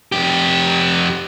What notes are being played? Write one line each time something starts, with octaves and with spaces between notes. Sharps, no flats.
F2 G4